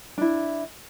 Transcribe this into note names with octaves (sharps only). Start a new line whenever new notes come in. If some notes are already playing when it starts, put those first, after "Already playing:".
D4 E4